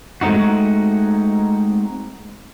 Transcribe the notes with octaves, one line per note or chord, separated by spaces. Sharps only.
G#3 A3 C4 D#4 F#4